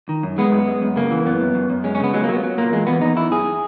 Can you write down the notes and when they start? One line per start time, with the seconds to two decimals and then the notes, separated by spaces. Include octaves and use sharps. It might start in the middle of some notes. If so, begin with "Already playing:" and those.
0.09 D#3
0.23 F#2
0.38 G#3 B3
0.52 F#2
0.68 G#3
0.82 F#2
0.96 C#3 A#3
1.11 E3
1.26 F#2 B3
1.41 F#2
1.55 F#2
1.70 F#2
1.84 G#3 C#4
1.95 C#4
2.00 C#3 B3
2.13 F#3 G#3
2.24 A#3
2.29 F#3 B3
2.43 F#3
2.58 A#2 A#3
2.72 E2 G#3
2.87 E2 B3
3.01 E2 D#4
3.16 E2 E4
3.32 F#2 G#4